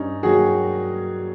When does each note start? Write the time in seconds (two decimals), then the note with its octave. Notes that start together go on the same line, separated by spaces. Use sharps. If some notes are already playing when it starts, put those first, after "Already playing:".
Already playing: G2 C#4 D#4
0.23 D#3 F#3 F#4 G#4